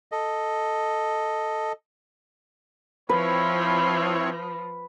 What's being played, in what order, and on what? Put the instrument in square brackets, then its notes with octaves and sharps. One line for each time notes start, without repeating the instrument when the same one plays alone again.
[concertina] A4 D#5
[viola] F3 [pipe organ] C4 E4 C#5 [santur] B4